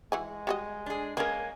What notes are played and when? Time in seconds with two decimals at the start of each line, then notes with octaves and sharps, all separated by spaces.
0.12 E3 G#3 F#4 G#5
0.47 G3 F#4 D#5
0.86 D4 G#4
1.17 G#3 A#3 C#4 A#4 B4 G#5